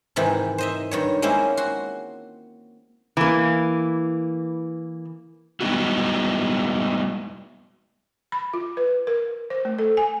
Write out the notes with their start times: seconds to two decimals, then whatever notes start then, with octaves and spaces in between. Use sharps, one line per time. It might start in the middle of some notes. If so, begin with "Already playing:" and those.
0.16 G#2 C3 D#3 E3
0.58 C5 D#5 E5
0.91 G2 D#3 C#5
1.22 G#3 A#3 C4 C#4 E4 C5
1.57 F#4 C6
3.17 E3 A#3
5.61 G3 G#3 B3 D#4 E4 F#4
8.32 B5
8.54 F4
8.77 B4
9.07 A#4
9.50 C5
9.65 A3
9.79 A4
9.97 G#5